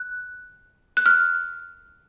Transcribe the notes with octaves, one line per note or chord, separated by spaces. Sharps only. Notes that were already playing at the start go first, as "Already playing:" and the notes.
Already playing: F#6
F#6
F6